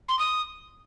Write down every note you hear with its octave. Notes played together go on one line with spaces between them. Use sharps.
C6
D#6